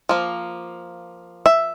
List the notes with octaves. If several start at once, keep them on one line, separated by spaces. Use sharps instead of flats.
F3 A#3
E5